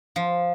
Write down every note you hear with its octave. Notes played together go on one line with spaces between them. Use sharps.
F3